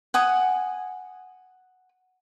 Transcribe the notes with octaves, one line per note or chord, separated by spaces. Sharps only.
F#5 G#5 D#6